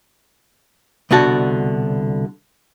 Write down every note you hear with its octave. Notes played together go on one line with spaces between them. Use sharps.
C2 B2 D3 F#4 A5